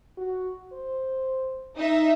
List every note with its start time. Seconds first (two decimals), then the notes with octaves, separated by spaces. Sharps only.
0.18 F#4
0.73 C5
1.76 D#4 E5